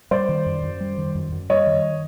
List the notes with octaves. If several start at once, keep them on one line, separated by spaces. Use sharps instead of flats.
G3 C5 D5
D#3
F#2
F#2
G3
D#3
F#2
F#2
G3 C#5 D#5
D#3